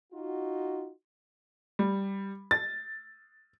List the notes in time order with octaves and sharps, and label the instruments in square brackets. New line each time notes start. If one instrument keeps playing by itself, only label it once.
[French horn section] D#4 F4 F#4
[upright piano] G3
A6